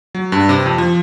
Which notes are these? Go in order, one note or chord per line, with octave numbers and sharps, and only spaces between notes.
F#3
G2
C3
F2
F3